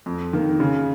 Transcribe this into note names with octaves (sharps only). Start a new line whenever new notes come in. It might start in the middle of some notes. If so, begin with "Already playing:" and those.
F2
D#3 A#3
C#3